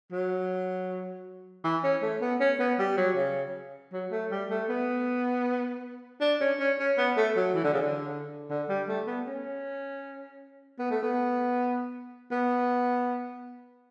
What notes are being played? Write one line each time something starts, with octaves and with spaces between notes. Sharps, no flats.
F#3
E3
C#4
A3
B3
C#4
B3
G3
F#3
C#3
F#3
A3
G3
A3
B3
D4
C#4
C#4
C#4
B3
A3
F#3
E3
D3
C#3
D3
D3
G3
A3
B3
C#4
B3
A3
B3
B3